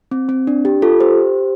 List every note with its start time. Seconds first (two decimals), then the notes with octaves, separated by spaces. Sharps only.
0.11 C4
0.29 C4
0.47 D4
0.65 G4
0.82 F4 A4
1.00 G4 C5